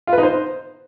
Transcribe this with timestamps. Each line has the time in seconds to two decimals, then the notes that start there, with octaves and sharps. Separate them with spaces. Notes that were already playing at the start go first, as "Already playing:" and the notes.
0.07 F4
0.13 B4
0.18 D#4
0.23 C5